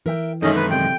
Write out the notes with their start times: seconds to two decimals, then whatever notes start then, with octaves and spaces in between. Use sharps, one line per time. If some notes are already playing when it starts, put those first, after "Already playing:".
0.06 E3 A#4 E5 G5
0.42 F#2 D#3 G#3 C#4 D#4 A4 D#5 E5
0.56 B4
0.71 C3 C4 D5 G5